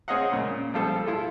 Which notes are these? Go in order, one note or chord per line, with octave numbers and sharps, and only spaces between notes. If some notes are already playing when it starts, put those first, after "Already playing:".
C4 G#4 C#5 D#5 F5 F#5
A#2 C#3
F3 G3 F4 A4 C5
E4 F4 A4